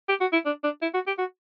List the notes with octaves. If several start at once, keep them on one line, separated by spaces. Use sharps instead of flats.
G4
F#4
E4
D4
D4
E4
F#4
G4
F#4